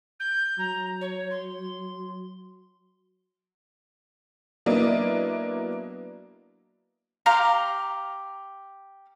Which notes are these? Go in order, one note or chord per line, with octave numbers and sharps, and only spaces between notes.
G6
F#3 A#5
C#5
C6
F#3 A#3 B3 D4 E4 D#5
G4 F5 A#5 C6